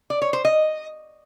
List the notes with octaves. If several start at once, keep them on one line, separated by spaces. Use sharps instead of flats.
D5
C#5
C5
D#5